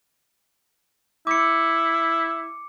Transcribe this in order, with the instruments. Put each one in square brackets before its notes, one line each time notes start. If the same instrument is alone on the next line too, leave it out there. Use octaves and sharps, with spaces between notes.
[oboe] E4 [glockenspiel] D6 C#7